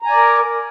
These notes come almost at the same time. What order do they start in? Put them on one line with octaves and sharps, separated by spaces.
A#5 G#5 D5 A#4